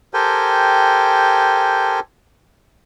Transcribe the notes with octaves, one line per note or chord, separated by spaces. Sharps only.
G4 A4 A#4 C5 G5 G#5